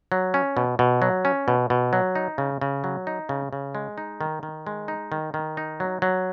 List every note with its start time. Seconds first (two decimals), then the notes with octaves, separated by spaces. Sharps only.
0.12 F#3
0.34 C#4
0.57 B2
0.79 B2
1.02 F#3
1.25 C#4
1.48 B2
1.70 B2
1.93 F#3
2.16 D#4
2.38 C#3
2.62 C#3
2.84 F#3
3.07 D#4
3.29 C#3
3.53 C#3
3.75 G#3
3.98 D#4
4.21 D#3
4.43 D#3
4.67 G#3
4.88 D#4
5.12 D#3
5.34 D#3
5.57 D#4
5.80 F#3
6.02 F#3